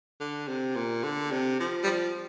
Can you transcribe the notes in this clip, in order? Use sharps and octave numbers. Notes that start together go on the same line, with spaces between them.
D3
C3
A#2
D3
C3
F3
G3
F3